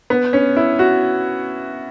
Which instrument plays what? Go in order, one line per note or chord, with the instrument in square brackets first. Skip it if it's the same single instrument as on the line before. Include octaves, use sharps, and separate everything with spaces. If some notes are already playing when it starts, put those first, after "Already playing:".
[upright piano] B3
C#4
E4
F#4